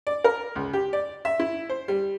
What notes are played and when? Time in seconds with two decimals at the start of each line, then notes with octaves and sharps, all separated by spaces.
0.07 D5
0.24 A#4
0.55 C#2
0.73 G4
0.93 D5
1.25 E5
1.39 E4
1.69 C5
1.88 G3